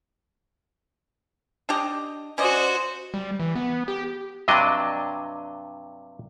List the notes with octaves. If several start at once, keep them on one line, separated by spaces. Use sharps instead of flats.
D4 G4 D#5
C#4 F#4 C5 D5 D#5
G3
E3
B3
G4
G2 C3 F#3 D4 D#5